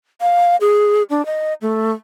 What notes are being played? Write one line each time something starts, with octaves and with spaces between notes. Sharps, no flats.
F5
G#4
D4
D#5
A3